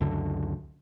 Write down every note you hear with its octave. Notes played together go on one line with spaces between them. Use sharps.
C#2 F#2 D3